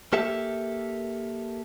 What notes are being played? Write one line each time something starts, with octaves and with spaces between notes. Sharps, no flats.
A#3 G4 A4 E5